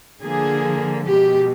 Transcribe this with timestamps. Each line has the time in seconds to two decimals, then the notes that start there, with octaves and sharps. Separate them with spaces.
0.23 D3 F3 A#3 G#4
1.07 B2 G#3 G4